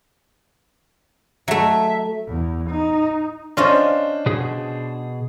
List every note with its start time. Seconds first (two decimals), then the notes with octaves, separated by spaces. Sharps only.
1.48 F#3 A3 E5
2.27 E2
2.70 D#4
3.57 C#4 D4 F4 C5 D#5
4.26 B2 G#4